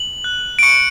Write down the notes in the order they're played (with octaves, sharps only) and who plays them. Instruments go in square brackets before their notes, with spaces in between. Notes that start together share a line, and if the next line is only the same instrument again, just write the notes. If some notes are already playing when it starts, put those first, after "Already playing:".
Already playing: [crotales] F#7
F#6
D7
C#6 C#7